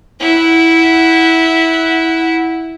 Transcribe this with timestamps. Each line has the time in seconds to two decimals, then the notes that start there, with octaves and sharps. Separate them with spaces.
0.21 E4 F#5